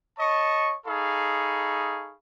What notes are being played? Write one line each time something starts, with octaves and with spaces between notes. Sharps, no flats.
C#5 D#5 A5 C#6
D#4 G#4 A4 F5 B5 C#6